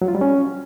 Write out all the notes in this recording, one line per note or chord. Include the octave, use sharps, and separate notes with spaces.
F#3
F4
G3
C#4